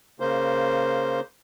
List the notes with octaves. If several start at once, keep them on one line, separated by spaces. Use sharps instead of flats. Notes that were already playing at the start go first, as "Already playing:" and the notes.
C#3 A#3 C5